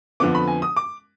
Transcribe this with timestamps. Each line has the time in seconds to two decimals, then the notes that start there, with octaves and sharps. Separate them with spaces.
0.20 F2 D3 F3 B3 D6
0.35 B5
0.48 G#5
0.62 D#6
0.77 D6